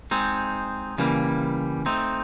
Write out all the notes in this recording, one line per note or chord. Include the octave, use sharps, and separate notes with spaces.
G#3 C4 D#4
C#3 E3 G3 A#3
A3 C4 D#4